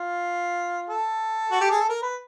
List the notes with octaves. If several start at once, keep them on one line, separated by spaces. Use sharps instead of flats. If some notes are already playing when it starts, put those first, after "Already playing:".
Already playing: F4
A4
F#4
G4
G#4
A4
A#4
B4